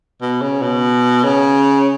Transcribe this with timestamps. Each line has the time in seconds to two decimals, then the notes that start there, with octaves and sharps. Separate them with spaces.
0.22 B2
0.42 C#3
0.62 B2
1.24 C#3